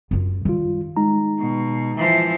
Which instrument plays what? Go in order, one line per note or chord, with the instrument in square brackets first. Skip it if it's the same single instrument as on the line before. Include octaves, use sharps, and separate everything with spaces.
[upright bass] F#2 F4
[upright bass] D#3 [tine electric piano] G3 F4
[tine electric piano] G#3 D#4 A#5
[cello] B2
E3 F3